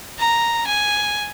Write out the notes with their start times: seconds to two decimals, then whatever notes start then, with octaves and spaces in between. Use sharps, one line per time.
0.19 A#5
0.67 G#5